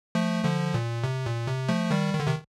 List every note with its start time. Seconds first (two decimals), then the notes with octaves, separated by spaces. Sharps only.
0.15 F3 A3
0.44 D3 F3
0.74 A#2
1.04 C3
1.26 A#2
1.47 C3
1.69 F3 A3
1.91 D#3 G3
2.14 D#3
2.20 D3
2.27 C3 D#3